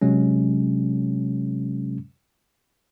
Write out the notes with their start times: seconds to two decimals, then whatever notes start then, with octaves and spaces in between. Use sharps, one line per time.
0.02 C3 F#3 G#3 C#4